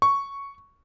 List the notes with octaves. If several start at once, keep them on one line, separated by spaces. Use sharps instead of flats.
C#6